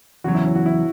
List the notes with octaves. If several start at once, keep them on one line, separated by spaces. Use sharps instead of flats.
E2 C#3 F#3 F#4
E4
C#4
F#4
E4